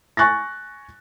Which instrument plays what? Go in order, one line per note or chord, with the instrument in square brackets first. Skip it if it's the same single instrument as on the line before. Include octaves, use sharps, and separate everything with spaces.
[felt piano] G#5 C#6 F#6 A6 A#6